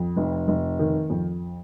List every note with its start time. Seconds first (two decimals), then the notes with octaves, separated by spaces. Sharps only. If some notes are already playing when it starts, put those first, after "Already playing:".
Already playing: F2
0.16 F1
0.48 F1
0.79 D#3
1.10 F2